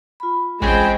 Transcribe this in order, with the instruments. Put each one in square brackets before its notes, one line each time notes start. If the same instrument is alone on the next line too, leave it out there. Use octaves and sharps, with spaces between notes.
[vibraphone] F4 B5
[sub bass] A1 [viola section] G#3 C5 G5 [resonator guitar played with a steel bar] C4 C#4 G#4